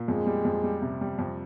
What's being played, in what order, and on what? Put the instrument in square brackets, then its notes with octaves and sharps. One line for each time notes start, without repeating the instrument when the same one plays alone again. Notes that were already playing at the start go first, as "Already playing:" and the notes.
Already playing: [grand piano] A#2
[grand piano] F2 [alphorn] G#3
[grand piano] G3
F2
G3
C3
G3
F2